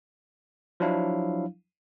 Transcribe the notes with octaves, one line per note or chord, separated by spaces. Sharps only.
F3 F#3 D4 E4 F5